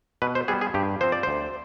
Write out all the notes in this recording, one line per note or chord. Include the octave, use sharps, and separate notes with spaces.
B2 B4
C5
G3 B3 G#4
G#4
G2 G4
F3 C4 C5
D5
D2 C5